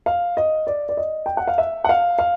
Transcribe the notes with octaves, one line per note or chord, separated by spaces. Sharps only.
F5
D#5
D5
D5
D#5
G5
F#5
F5
E5
F#5
F5
F5